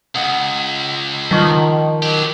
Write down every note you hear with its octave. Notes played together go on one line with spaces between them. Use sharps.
C#2 F#5 D#6
D#3 F3 C#6 F#7
F#3 G4